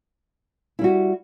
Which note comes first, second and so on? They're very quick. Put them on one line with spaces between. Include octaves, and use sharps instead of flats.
E4 G3 F#4